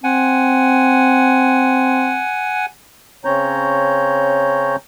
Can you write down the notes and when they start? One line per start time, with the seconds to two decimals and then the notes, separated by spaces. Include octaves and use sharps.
0.04 C4 F#5 G#5
3.25 C#3 C4 C#4 C#5 A#5 G6